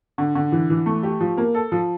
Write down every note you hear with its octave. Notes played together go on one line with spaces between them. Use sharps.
D3
D3
E3
E3
A3
G4
F3
A#3
A4
F3